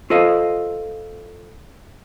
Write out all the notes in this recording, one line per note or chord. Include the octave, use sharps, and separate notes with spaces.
F4 A4 C5 D#5 F5